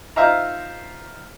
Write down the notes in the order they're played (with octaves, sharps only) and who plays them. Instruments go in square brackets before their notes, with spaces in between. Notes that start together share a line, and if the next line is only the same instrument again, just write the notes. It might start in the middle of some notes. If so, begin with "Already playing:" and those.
[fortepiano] D#4 F4 C5 E5 F5 A#5